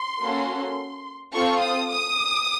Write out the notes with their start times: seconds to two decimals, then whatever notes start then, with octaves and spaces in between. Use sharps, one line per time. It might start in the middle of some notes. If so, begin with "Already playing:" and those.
Already playing: C6
0.21 A#3 C#4 F#4 A4
1.34 C4 F4 A4 C#6
1.61 D#6
1.90 D#6